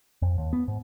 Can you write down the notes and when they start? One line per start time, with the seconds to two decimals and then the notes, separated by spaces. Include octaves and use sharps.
0.22 F2
0.38 D#2
0.53 B3
0.68 G#2